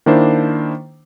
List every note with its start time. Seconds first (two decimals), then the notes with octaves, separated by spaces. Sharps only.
0.06 D#3 A#3 D4 E4 C5